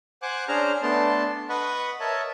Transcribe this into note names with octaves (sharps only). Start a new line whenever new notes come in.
C5 F#5 G#5 D6 F#6
C#4 D4 G#4 C5 A#5 F6
A3 B3 D4 A5 C6
B4 D#5 F#5 B5 C#6
A#4 C#5 D#5 E5 A5